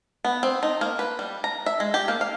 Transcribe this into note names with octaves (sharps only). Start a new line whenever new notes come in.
B3
C4
D#4
A#3
B4
G3
A#5
E5
G#3
G4
A#3
F5